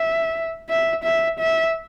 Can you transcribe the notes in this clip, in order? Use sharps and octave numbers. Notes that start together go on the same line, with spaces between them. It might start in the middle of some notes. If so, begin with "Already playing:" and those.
Already playing: E5
E5
E5
E5